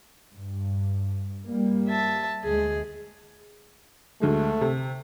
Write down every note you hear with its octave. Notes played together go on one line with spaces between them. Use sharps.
G2
G3 A#3
E5 A5
D2 G#3 G#4
D2 G#3 A3
C3